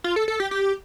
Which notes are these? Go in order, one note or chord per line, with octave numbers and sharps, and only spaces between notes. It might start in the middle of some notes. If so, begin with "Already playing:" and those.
F4
A4
A4
G4
G4